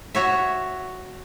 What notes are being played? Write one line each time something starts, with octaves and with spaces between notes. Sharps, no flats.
F#4 C#5 E5